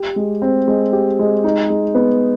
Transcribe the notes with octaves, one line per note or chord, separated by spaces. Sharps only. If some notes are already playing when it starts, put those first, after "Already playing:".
Already playing: G4
G#3
C4
G#3
G4
G#3
D#4
G#3
B3